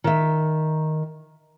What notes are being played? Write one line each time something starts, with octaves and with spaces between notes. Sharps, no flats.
D#3 E5